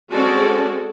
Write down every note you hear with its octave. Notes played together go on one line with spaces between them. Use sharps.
G#3 C4 C#4 F#4 A4 D5